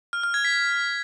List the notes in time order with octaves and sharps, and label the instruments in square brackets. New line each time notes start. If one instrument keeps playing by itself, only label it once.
[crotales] F6
F6
G#6
B6